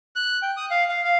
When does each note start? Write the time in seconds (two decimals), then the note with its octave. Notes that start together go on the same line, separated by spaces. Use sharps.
0.16 F#6
0.42 G5
0.57 D#6
0.71 F5
0.89 F5
1.04 F5